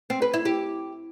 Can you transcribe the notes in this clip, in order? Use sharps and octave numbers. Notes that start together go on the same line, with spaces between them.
C4
B4
E4
G4